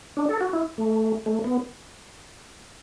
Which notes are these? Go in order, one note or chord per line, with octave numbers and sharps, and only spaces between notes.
D4
A4
F#4
E4
A3
A3
B3